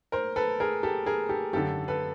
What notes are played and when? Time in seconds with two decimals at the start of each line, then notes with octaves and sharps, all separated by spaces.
0.12 A#4 C5
0.36 A4 B4
0.60 G#4 A#4
0.83 G4 A4
1.06 G#4 A#4
1.29 G4 A4
1.53 G#1 F#2 D3 G4 A4
1.88 A4 B4